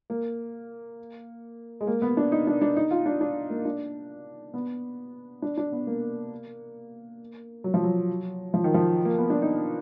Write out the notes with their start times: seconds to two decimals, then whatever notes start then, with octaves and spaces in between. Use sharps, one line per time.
0.10 A#3
1.81 G#3
1.87 A#3
2.02 B3
2.17 D4
2.32 D#4
2.47 D4
2.62 D4
2.77 D#4
2.91 F4
3.06 D4
3.21 D4
3.50 A#3
3.65 D4
4.54 B3
5.42 D4
5.58 D4
5.72 B3
5.87 A#3
7.64 F#3
7.74 F3
7.84 F#3
8.54 F3
8.64 D#3
8.74 F3
9.05 A#3
9.18 B3
9.30 D4
9.42 D#4